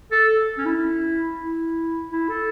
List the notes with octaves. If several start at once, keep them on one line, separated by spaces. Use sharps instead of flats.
A4
C#4
E4
E4
E4
A4